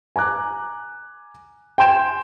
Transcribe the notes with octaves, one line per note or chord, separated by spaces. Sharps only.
G#5 A#5 D6 F#6
G5 G#5 C6 G6 E7